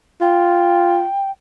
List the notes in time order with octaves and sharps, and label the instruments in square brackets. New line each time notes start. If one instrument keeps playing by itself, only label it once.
[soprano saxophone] F4 [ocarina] G5